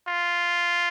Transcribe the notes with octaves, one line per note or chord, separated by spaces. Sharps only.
F4